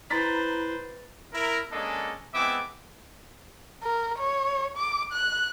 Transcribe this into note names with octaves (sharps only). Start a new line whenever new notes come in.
E4 B4 C5 A#5 A6 B6
E4 A#4
G#3 A#3 C#4 D4 A4 D#5
G#3 B3 C4 E4 E5 D6
A#4
C#5
D6
F#6